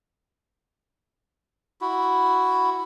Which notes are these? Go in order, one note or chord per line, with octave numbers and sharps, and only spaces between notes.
E4 F#4